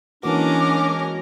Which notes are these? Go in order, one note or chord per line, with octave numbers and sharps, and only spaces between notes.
E3 G#3 A#3 C#4 D4 F#4 A#4 D6